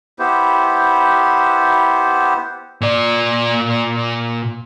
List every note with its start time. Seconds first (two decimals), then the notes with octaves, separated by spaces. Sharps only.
0.19 B3 E4 G4 C5
2.81 A#2 D5